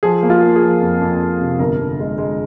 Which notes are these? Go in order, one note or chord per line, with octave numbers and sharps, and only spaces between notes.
F3 G#4
A#3
F4
A#3
G#4
F3
F2
F2
F2
C3
G1 A#4
D3
G#3
G#3